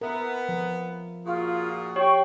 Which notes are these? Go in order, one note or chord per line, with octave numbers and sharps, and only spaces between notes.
B3 A#4 E5
F3
A#2 F4 F#4 G#4
G4 C#5 G5 C#6